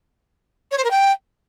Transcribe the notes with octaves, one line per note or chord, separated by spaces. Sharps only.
C#5
C5
A#4
G5